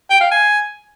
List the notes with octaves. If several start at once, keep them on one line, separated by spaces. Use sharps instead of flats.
G5
F5
G#5